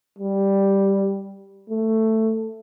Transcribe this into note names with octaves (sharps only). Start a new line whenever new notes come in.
G3
A3